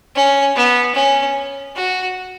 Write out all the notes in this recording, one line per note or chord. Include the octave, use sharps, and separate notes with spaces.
C#4
B3
C#4
F#4